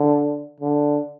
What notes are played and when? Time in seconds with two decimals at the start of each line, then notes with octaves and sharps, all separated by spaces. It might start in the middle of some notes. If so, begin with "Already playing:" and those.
Already playing: D3
0.60 D3